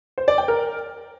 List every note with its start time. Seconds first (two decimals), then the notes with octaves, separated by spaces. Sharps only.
0.18 C5
0.28 D5
0.38 G5
0.48 A#4